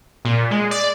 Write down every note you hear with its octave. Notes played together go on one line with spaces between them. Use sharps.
A#2
G#3
D5